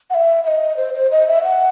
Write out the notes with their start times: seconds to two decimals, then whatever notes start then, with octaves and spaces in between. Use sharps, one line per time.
0.10 F#5
0.14 E5
0.44 E5
0.48 D#5
0.77 C5
0.94 C5
1.11 D#5
1.28 E5
1.44 F#5